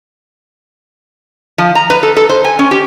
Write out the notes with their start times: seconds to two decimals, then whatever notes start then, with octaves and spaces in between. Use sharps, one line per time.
1.58 F3
1.75 A#5
1.90 B4
2.03 A4
2.17 A4
2.29 C5
2.44 G#5
2.59 C#4
2.71 G4